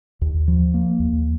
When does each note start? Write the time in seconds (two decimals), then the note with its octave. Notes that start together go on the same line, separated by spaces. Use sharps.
0.21 D#2
0.48 F3
0.74 A#3
0.99 D#2